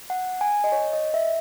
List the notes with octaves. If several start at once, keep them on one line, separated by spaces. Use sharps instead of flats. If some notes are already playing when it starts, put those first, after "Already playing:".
F#5
G#5
D#5
C#5
D#5
E5